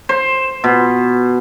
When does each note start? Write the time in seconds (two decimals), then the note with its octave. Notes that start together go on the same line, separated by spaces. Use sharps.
0.09 C5
0.64 B2